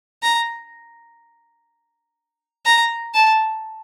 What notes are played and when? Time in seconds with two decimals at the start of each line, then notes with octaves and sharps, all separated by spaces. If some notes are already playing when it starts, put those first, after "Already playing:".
0.22 A#5
2.65 A#5
3.14 A5